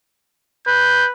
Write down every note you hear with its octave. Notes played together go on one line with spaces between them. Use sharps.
B4 G6